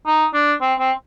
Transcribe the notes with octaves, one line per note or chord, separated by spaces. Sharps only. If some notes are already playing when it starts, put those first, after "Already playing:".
D#4
D4
C4
C4